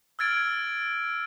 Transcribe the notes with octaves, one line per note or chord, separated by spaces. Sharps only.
E6 F6 G#6 A6 D7